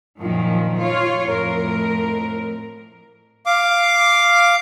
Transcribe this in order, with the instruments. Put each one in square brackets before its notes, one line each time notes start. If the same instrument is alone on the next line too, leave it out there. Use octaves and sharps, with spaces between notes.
[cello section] F#2 A#2 D#3 F3
F4 C#5
F2 A2 A#4
[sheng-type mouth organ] F5 D6